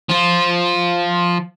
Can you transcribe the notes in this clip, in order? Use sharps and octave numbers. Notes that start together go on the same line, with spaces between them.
F3 F4